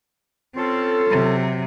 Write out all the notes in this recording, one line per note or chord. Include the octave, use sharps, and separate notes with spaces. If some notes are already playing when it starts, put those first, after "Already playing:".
C4 C#4 F4 A4
C3 F#3